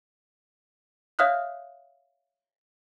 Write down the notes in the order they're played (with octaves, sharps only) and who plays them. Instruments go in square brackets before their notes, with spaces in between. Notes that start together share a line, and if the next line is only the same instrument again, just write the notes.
[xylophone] C#5 E5 F5 D#6 F6 F#6